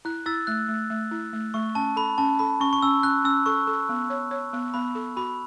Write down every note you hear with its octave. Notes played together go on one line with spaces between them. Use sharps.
E4 F#6
E4 E6 A6
A3 F#6
A3
A3
E4
A3
A3 C#6
C#4 A5
A4 B5
C#4 A5
A4 B5
C#4 C#6
C#6
C#4 E6
C#4 F#6
C#4 E6
A4 C#6
A4
B3
C#5
C#5
B3
B3 B5
A4
F#4 B5